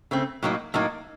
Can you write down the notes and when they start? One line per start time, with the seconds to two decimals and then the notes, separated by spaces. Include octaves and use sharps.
0.11 C#3 A3 C4
0.43 A2 F#3 A#3 D#4
0.74 A2 F#3 A#3 D#4